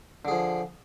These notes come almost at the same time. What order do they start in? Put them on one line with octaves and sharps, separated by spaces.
D3 G#4 F3